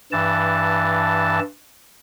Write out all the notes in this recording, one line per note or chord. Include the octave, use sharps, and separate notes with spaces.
G2 E3 A5